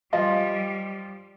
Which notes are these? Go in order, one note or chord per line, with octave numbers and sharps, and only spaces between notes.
F3 G3 F4 D#5 F5 G#5 C6